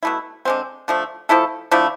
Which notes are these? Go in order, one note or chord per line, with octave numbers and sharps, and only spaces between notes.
B2 A3 E4
D3 G#3 C4
D3 F3 A3
F3 A3 E4 A4
D3 F3 A3 E4